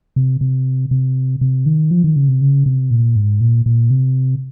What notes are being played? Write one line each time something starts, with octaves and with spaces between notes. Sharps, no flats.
C3
C3
C3
C3
D#3
F3
D#3
C#3
C3
C#3
C3
A#2
G#2
A#2
A#2
C3